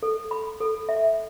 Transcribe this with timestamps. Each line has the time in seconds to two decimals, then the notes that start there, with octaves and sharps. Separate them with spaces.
0.03 A4
0.31 B5
0.60 A4
0.89 E5